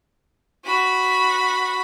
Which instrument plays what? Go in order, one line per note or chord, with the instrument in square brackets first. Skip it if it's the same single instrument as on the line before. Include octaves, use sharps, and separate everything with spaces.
[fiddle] F#4 B5